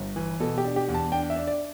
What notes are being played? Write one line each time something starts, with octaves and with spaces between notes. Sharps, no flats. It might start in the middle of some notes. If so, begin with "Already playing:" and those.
Already playing: G1
E3
B2 A4
G4
D4
G4
E2
A5
D4 G5
E5
D4
D5